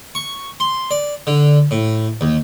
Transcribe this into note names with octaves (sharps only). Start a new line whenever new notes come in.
C#6
C6
D5
D3
A2
D#2